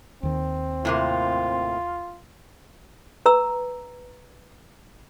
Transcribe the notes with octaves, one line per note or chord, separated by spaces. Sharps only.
D#2 D#3 C4
A2 C3 A#3 F4
B4 A#5 E6